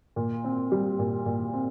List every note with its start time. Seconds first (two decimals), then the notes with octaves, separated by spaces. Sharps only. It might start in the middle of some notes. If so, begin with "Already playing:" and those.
0.16 A#2
0.44 C4
0.72 G3
0.99 A#2
1.26 A#2
1.53 C4